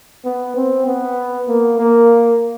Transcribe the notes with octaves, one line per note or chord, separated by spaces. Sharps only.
B3
C4
B3
A#3
A#3